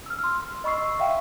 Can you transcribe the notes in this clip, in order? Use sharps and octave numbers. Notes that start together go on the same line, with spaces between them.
E6 F6
C6
D#5 B5 C#6 E6 C7
E5 F5 G5